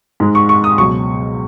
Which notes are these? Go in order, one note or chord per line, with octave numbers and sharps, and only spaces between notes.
G#2 G#3
C#6
C#6
D#6
C#2 B2 F#3 C#6